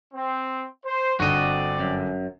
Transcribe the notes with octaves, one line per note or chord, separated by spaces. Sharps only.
C4
C5
G1 D3 C4 F#4 D5 D#5 D6
F#2